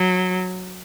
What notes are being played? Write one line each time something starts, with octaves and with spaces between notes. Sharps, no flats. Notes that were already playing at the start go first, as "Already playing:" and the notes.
Already playing: F#3